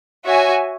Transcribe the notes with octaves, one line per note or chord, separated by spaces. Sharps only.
F#4 C#5 E5 G#5